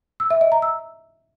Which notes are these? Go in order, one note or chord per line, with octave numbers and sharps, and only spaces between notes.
E6
E5
D#5
A#5
E6